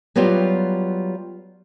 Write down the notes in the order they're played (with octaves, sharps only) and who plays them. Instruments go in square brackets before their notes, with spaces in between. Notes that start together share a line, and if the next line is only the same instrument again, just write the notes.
[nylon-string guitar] F#3 G3 B3 F4 G4